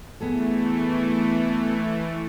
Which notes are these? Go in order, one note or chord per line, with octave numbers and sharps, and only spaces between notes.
E3 A3 B3 G#4 A4